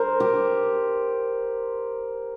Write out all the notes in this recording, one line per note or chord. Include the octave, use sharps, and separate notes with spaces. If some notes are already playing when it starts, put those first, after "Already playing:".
Already playing: A#4 C5
G4